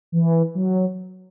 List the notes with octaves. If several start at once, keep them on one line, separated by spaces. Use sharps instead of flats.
E3
F#3